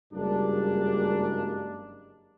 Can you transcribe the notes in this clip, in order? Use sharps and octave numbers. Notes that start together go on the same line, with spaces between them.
F#1 G2 G3 G#3 A#3 D4